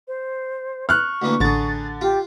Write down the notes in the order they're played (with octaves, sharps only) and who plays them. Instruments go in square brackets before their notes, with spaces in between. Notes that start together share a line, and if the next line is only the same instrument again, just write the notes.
[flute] C5
[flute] C#6 [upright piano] F6 F#6
[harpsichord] D2 E3 A#3
[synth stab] A1 A6 [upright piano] D3 [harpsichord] G#4 A#5
[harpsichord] F4 [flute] G4